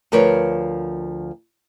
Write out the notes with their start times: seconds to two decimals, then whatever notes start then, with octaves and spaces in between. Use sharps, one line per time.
0.12 D2 F3 A#4 B4 C#5